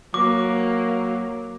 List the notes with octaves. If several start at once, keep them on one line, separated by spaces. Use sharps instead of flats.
F#3 A#3 D6